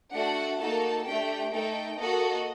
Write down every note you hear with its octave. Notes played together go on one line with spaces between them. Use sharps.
A3 D4 F#4 A4 F#5
A#3 D#4 F#4 A4 A5
A3 D4 G4 G5
A3 D#4 A4 G5
A#3 F#4 A4 D#5